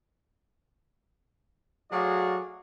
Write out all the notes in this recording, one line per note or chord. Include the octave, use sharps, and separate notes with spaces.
F#3 A3 F#4 G#4 D5 F5